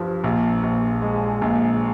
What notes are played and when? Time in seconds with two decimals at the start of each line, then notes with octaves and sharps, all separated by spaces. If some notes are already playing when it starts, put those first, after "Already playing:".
Already playing: G2 F3
0.24 A#1
0.63 A#1
1.02 G#3
1.42 A#1